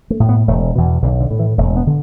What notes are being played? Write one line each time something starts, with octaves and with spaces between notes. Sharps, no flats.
A3
A2
B3
E1 A3
E2 B2
B1 D3
D3
A2
E3
E1 A3
B3
D3